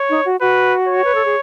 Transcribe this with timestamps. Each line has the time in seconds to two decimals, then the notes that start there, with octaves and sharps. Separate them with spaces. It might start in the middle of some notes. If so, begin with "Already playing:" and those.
Already playing: C#5
0.10 D#4
0.25 F#4
0.41 F#4 B4
0.88 C#5
1.04 B4
1.15 A4
1.25 G#4